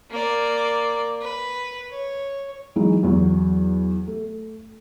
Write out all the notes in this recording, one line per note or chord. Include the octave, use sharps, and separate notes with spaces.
A#3 D5
B4
C#5
E3 F#3 G#3 D#4
E2 F#3
A3